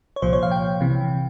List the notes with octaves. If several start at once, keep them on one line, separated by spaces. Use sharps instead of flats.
C#5
C2 A#2 F3 C5
C#5
F5
G5
C2 C3 E3